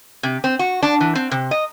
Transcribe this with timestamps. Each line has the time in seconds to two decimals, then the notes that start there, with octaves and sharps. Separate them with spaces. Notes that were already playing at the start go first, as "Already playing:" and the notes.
0.23 C3
0.44 C4
0.59 F#4
0.83 D4
1.01 E3
1.15 C4
1.31 C3
1.51 D#5